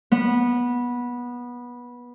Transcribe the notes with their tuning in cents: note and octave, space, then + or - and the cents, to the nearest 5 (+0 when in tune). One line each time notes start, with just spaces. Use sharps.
B3 -20